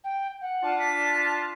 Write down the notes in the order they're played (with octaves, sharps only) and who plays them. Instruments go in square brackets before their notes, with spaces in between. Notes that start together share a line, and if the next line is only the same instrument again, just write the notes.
[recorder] G5
F#5
[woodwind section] D4 F4 A5
[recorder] B6